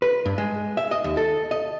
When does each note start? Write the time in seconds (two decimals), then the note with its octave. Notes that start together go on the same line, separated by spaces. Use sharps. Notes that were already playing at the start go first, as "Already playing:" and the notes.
0.02 B4
0.26 G2
0.38 G#3
0.77 E5
0.91 D#5
1.04 D#2
1.17 A4
1.51 D#5